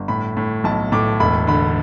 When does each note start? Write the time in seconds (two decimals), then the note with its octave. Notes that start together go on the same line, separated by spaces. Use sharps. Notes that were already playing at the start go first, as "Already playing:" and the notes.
Already playing: G1
0.08 A2 B5
0.37 A2
0.64 B1 A5
0.92 A2 D6
1.20 E1 B5
1.47 D3 B5